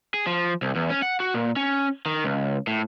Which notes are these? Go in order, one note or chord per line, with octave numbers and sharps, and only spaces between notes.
G#4
F3
C2
E2
C#4
F#5
F#4
A#2
C#4
D#3
C#2
A2